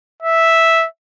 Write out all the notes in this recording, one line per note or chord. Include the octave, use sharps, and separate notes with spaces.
E5